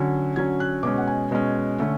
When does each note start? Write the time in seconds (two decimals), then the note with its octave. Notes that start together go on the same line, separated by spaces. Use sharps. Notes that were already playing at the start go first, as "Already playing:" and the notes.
Already playing: D3 F#3 C#4
0.36 D3 F#3 C#4 G#6
0.60 F#6
0.83 B2 G#3 C#4 D6
0.98 F#5
1.07 G#5
1.31 B2 G#3 C#4
1.79 D3 A3 C#4